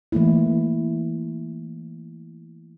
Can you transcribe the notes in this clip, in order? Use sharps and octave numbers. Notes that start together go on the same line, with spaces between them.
E3 A3 A#3 E4